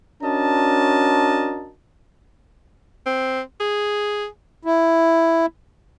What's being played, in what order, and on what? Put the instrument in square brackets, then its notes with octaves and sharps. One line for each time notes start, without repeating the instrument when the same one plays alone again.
[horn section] C#4 D4 F#4 A#4 D#5 A5
[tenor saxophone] C4
G#4
[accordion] E4